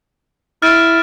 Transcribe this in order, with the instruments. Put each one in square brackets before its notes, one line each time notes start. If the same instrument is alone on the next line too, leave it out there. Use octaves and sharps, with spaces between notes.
[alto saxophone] E4 [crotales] F6 A6 D7